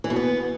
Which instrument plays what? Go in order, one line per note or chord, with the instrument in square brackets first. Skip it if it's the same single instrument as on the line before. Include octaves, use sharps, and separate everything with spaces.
[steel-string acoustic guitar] E3
B2
B3